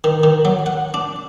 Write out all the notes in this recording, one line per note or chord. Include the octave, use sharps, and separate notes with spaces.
D#3
D#3
F#3
F#5
D4